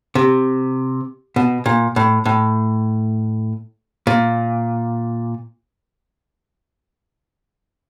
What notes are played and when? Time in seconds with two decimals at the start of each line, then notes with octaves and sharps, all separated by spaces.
0.15 C3
1.36 B2
1.66 A#2
1.96 A2
2.25 A2
4.07 A#2